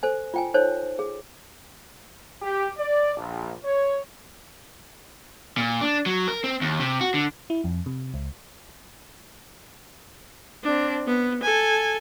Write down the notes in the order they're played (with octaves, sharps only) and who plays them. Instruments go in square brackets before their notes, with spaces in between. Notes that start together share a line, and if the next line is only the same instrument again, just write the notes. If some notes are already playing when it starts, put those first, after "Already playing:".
[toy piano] A4 C5 G#5
F4 G5 G#5
D#4 A4 C5 C#5
G#4
[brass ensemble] G4
D5
A#1
C#5
[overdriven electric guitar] A#2
D4
F#3
A#4
C4
D#2
C3
F#4
D3
[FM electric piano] E4
F2
C3
C#2
[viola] C4 D4
B3
A4 G#5